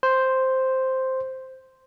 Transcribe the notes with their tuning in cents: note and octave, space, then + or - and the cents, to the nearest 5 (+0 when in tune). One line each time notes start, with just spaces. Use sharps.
C5 +0